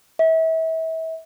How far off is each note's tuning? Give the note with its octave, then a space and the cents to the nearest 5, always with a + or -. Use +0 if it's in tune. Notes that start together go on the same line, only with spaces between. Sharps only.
E5 -35